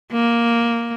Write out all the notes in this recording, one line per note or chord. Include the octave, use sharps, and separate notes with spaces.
A#3